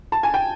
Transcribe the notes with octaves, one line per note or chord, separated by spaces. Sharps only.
A5
G#5
G5